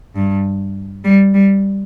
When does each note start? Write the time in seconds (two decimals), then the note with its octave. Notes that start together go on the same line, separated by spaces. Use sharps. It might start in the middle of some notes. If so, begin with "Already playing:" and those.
0.15 G2
1.04 G3
1.34 G3